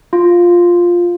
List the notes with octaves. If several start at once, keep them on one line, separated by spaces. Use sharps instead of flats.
F4